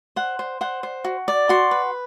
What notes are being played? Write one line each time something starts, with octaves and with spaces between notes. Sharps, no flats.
C5 F#5
C5
C5 F#5
C5
F#4
D5
F#4 C6
B4